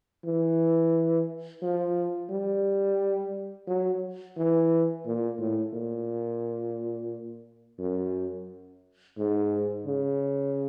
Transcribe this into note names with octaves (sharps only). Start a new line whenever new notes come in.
E3
F3
G3
F#3
E3
A#2
A2
A#2
F#2
G#2
C#3